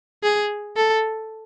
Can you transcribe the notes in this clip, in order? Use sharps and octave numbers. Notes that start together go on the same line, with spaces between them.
G#4
A4